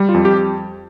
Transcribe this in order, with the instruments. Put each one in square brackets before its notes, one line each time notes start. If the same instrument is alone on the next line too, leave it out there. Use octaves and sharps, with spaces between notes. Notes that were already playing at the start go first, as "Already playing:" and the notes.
Already playing: [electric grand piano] G3
F4
F2
G4